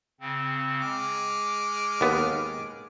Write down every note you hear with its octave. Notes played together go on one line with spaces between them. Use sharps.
C#3 C4
G#3 D6 F6
D#2 B3